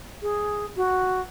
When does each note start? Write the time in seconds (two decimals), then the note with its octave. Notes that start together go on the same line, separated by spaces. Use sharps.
0.22 G#4
0.77 F#4